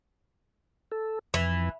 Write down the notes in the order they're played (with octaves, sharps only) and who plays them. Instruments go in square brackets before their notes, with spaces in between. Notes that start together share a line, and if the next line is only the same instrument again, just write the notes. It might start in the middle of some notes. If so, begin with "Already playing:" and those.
[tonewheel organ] A4
[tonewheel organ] F2 [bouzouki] E3